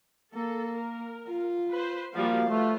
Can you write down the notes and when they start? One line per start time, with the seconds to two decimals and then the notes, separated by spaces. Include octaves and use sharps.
0.33 A#3 A4
0.77 A#4
1.27 F4
1.72 B4 C5
2.13 F3 G3 A#3 F#4 F5
2.48 A3 F4 B4 C5